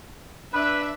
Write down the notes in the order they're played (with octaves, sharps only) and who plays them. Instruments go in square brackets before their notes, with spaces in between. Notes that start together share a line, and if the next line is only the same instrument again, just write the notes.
[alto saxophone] D4 [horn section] B4 [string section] E5